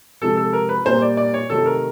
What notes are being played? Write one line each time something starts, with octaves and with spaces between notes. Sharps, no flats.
C3 F3 G#3 A4
A4
A#4
B4
A#2 G3 A#3 C5
D5
D5
C#5
C3 D#3 F#3 A3 A4
A#4